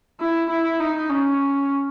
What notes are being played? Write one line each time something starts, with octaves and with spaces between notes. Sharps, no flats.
E4
E4
D#4
C#4